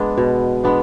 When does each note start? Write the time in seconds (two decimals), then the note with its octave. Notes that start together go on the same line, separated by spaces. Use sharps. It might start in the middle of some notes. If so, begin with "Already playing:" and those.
Already playing: G#3 B3 D4
0.18 B2
0.64 G#3 B3 D4